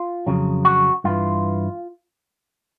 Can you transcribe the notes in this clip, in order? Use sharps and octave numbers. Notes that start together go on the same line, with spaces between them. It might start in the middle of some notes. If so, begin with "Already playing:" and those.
Already playing: F4
F2 C#3 F#3
F#4
G2 E3 F4